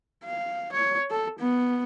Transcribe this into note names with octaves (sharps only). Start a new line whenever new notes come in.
F5
C#5
A4
B3